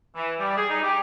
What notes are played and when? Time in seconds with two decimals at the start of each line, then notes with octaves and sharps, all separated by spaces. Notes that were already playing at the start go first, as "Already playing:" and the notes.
0.15 E3
0.39 G3
0.57 G#4
0.70 D#4
0.84 G4